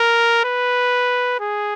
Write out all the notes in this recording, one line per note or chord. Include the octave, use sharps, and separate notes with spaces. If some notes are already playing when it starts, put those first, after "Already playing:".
Already playing: A#4
B4
G#4